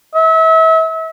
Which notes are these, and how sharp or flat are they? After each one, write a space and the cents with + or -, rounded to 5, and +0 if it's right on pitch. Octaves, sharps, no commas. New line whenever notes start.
E5 -35